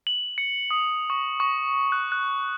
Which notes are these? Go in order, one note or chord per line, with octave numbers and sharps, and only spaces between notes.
F#7
C#7
D#6
C#6
C#6
F#6
F#6